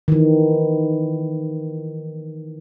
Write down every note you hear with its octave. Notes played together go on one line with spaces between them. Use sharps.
D#3 E3